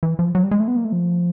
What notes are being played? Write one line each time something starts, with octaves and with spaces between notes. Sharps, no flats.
E3
F3
F#3
G3
G#3
A3
B3
A#3
A3
F3